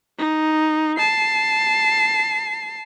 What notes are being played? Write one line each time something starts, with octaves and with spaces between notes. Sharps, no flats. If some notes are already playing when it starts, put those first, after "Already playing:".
D#4
A5 C7